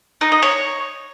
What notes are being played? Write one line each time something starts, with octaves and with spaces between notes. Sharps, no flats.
D#4
D#5
C#5